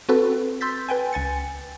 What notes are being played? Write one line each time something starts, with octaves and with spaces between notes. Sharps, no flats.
C4 F#4 A4 B4
C6 E6 G6 A6 B6
B4 G5 G#5
C#2 G#5 A6 C#7